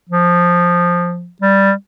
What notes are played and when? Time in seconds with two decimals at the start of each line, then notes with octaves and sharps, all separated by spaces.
0.09 F3
1.42 G3